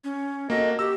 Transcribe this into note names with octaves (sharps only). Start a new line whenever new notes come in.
C#4
A#3 F#4 A4 D#5
G4 E6